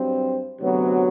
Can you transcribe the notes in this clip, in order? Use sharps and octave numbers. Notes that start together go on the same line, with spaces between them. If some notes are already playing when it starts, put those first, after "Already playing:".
Already playing: G2 F#3 C4
D2 C3 F#3 B3